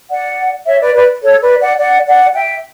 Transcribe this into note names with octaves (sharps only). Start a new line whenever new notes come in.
D5 F#5
C#5 E5
B4 D5
B4 D5
A4 C#5
B4 D5
D5 F#5
D5 F#5
D5 F#5
E5 G5